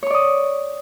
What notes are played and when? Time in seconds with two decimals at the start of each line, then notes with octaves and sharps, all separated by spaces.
0.03 C#5
0.06 C#6
0.10 D5
0.14 D#6